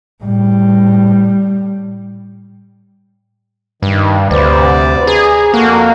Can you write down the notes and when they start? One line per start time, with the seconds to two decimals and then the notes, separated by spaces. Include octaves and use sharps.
0.23 A2 G3
3.83 G2 D#3
4.31 D2 C3 B4 C5 D5
5.07 G#4 A#5
5.54 F2 A#3 F#4 A4